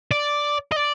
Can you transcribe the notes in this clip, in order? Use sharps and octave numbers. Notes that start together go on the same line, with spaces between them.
D5
D#5
D5